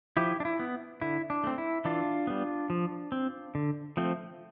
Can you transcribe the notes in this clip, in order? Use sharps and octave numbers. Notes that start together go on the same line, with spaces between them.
F3 E4 G4
D4
E4
B3
D3 E4
D4
A3 C4
E4
E3 D4 F4
G3 B3
F3
C4
D3
F3 A3 C4